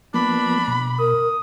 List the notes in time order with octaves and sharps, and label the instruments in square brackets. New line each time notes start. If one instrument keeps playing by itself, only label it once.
[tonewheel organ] F3 A#3 B3 [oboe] D4 [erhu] B5
[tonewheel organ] B2
[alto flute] A#4 [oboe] D#6